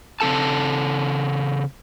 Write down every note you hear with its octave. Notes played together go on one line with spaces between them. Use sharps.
C#3 C4 A4 A5